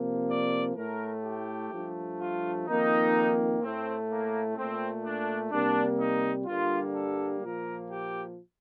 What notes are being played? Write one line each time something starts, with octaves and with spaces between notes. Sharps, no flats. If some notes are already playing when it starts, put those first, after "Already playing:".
Already playing: C3 F3 A#3
D5
A2 A3 A#4
G4
G2 F3 A3
F4
F2 D#3 A#3 D#4
A2 A3 C4
A#3
A#2 A3 C4
D4
C3 G3 A#3 D4
D#4
G2 D3 G3 A#3 F4
A4
A#2 F3 A#3 A#4
G4